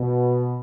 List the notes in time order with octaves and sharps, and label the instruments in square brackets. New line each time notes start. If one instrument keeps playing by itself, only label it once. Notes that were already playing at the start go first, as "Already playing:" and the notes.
Already playing: [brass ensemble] B2